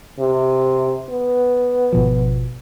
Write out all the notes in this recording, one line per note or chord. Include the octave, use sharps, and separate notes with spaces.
C3
B3
G#1 B2 F3